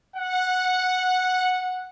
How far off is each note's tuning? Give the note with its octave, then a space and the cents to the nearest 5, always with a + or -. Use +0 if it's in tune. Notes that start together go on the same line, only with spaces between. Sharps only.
F#5 -10